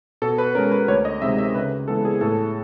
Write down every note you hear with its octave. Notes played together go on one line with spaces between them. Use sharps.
B2 A4
B4
G#3 C#4 A#4
B4
D2 C#5
D#5
C3 D#3 G#3 C4 E5
E5
C#3 B4
E3 G#3 B3 A4
G#4
A2 A4